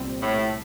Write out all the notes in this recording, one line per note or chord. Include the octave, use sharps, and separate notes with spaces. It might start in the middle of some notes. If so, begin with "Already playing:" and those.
Already playing: C2 A#2 G3 C4
A2